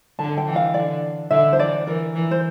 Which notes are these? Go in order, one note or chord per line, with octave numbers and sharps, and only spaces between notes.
D3 A5
G5
E3
F5
D3 D5
D3 E5
C5
E3 D5
E3 A#4
E3
C5